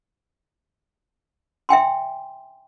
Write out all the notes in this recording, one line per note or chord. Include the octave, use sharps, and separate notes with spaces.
E5 G5 G#5 C6